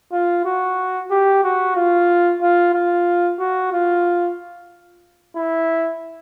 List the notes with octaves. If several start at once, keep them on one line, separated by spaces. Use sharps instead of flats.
F4
F#4
G4
F#4
F4
F4
F4
F#4
F4
E4